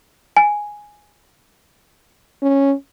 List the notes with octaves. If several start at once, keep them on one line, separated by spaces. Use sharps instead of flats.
G#5
C#4